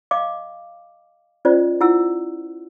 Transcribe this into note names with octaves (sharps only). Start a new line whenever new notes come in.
D#5 F5 D6
C#4 F4 C5 D5 D#5
E4 F4 F#5 E6